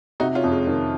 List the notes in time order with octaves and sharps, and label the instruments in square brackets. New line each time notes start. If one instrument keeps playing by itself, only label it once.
[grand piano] C3 [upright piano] D#4 F#4
[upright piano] C#4 F4
[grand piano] F2
[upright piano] G#3
[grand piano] D#3